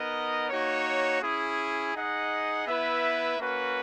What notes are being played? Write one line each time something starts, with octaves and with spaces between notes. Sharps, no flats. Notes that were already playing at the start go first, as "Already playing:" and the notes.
Already playing: B3 D#4 A#4 D#5 F#5
A#3 D#4 F#4 C#5
C#4 E4 G#4
D#4 G#4 D#5 F#5
B3 E4 B4 E5
A#3 C#4 F#4 B4